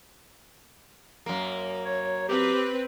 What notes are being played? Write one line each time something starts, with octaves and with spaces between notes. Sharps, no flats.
F#2 A#3
C#5
C4 G4 B4